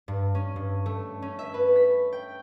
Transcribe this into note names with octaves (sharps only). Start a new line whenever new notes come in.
G2
C#4
G2
A3
C#4
E5
B4
B6
G5